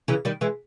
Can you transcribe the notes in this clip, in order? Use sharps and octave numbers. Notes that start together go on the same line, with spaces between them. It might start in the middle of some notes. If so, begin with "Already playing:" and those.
C#3 E3
D#3 G3
E3 G#3